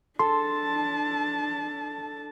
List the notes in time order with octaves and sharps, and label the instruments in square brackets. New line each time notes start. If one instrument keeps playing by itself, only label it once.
[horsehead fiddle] D4 A5 [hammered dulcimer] A4 [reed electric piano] C6